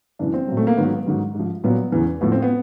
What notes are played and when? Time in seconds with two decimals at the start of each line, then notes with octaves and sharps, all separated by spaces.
0.19 F#2 C#3 E3 D4
0.34 C4
0.48 A#2 F#3
0.57 A3
0.67 A#3
0.77 G#2 D#3 F#3 B3
1.06 G#2 D#3 F#3
1.35 G#2 F3
1.64 A#2 F#3 B3
1.92 E2 C#3 E3
2.21 A2 F3 B3
2.32 C4
2.42 B3